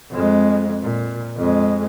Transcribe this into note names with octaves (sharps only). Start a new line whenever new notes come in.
F2 G#3
A#2
F2 G#3